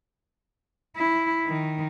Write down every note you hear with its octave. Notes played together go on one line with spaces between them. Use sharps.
E4
D#3